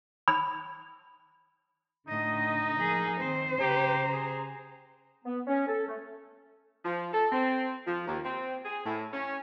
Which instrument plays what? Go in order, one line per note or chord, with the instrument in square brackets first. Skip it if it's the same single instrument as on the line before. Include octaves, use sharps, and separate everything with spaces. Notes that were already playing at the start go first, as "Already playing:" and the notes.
[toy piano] B5
[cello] A2 D#5 [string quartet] D3 [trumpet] D#4
[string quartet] F3 A#3 [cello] G#4
[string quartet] D#3 C4 [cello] C5
[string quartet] C#3 A#5 [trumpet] G4
[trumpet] G#4
[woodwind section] B3
C#4
A4
A3
[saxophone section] F3
A4
C4
F3
D#2
C4
G#4
A2
C#4